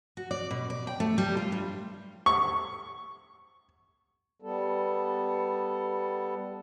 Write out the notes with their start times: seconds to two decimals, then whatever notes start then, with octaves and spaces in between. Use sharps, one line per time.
0.17 F#4
0.31 D5
0.51 B2
0.70 D5
0.87 G5
1.00 A3
1.18 G3
1.37 F4
1.52 G2
2.26 C#6
4.42 G3 B3 A4